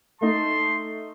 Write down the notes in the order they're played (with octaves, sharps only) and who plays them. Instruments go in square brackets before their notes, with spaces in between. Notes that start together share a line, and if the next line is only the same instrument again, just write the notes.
[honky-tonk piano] A3 D#4 [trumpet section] A5 C6